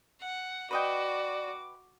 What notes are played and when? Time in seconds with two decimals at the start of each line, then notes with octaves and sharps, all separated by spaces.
0.21 F#5
0.71 F#4 B4 D5 D#5 G5 D6